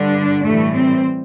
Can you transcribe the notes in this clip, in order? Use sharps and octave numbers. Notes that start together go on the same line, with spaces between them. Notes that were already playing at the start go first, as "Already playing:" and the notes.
Already playing: G2 D3 G3 D4
A2 E3 G3 A3
C4